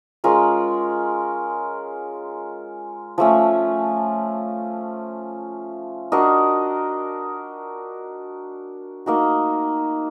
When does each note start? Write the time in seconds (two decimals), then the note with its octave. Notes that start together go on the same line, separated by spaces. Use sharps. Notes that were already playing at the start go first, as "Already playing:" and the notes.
0.24 G#3 C#4 F4 A#4
3.18 F3 A3 C#4
6.12 D4 F#4 A#4 D#5
9.06 A#3 D#4 F#4